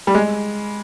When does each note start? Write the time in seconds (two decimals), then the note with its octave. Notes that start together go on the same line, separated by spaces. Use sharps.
0.07 G3
0.15 G#3